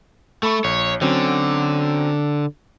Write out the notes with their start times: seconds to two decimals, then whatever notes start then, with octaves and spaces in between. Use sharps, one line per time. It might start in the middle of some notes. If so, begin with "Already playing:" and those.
0.43 A3 A4 B5 C#6
0.64 A#1 C#5
1.01 D3 F#3 C4 C#4